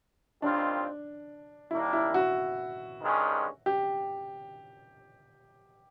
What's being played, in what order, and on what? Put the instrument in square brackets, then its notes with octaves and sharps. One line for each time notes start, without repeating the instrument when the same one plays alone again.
[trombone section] D#2 D#3 G3 C4 F4 [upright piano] D4
[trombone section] D#2 D#3 G3 A#3 D4 [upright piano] E4
[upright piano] E4
F#4
[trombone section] G2 D#3 G#3 C#4
[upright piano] G4